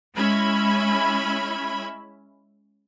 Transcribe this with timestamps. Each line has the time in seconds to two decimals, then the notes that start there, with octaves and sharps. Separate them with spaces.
0.16 G#3 C#4 E4 E5 B5 G#6